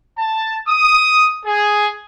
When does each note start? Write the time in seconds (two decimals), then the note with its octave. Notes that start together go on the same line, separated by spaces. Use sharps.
0.18 A5
0.67 D#6
1.46 G#4